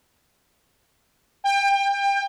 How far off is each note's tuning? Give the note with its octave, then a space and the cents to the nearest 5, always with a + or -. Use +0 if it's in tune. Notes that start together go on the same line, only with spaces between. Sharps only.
G5 +30